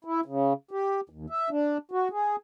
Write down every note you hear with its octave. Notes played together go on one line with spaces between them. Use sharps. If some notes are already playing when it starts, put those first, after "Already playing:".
E4
C#3
G4
D#2
E5
D4
F#4
G#4